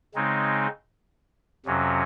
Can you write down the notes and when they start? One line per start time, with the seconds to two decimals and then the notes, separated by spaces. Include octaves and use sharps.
0.15 C#3 G#3 C4 D#4
1.65 F2 C3 F#3 C#4